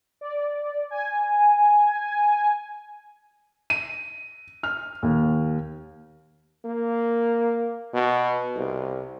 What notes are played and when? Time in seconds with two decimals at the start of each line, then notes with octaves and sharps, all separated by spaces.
0.21 D5
0.91 G#5
3.70 D#7
4.63 F6
5.03 D#2
6.65 A#3
7.94 B2
8.56 C2